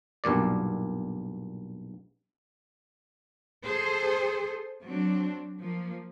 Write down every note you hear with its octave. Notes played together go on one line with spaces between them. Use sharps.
B1 G2 A#2 D5
G#4 A4 C5
F#3 C4 D4
F3 A#3